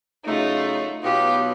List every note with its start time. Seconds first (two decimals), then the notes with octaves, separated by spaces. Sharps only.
0.26 C#3 F#3 A3 D#4 F4
1.03 B2 F#3 B3 D#4 F4 G4